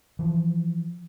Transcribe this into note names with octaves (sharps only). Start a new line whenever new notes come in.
E3 F3